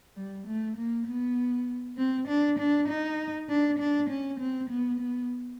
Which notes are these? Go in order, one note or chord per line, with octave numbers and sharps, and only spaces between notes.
G3
A3
A#3
B3
C4
D4
D4
D#4
D4
D4
C#4
C4
B3
B3